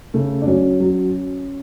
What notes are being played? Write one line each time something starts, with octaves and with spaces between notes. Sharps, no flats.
C#3 A3
D4
F#3 C#4
F#3